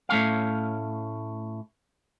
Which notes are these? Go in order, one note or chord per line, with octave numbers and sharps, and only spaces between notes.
A2 A3 C#4 F5